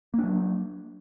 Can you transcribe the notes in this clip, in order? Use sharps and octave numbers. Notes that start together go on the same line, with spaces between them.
F#3 A#3 D4